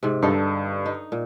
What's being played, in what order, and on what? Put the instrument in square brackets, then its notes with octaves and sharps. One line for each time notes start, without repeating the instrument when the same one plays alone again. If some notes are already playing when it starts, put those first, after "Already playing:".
[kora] G#2 C3
[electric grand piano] G2 [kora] D3 D#4 A4
[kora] D#4
A#2